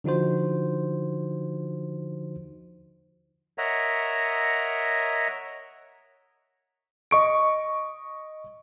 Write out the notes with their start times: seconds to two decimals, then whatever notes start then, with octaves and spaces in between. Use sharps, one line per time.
0.04 D3 F3 D#4 F#4 C5
3.58 A#4 C#5 D#5 E5 F#5 A#5
7.11 D#5 C#6 D7